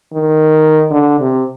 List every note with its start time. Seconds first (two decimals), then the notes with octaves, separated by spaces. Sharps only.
0.13 D#3
0.91 D3
1.20 C3